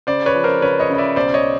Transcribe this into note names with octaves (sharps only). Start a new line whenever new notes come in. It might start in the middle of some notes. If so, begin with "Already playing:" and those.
C#3 C5 D5
B4 C#5
F3
A#4 C5
C#3 B4 C#5
C#5 D#5
C#3 D#5
D5 E5
B1 C5 D5
C#5 D#5